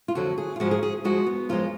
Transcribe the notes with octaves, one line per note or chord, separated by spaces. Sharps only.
F4
F2 D3 F#3 F#4
G#4
F4
G#2 F3 G#3 F#4
G#4
G#4
G#2 F3 G#3 F#4
B3
F#2 F3 G#3 F4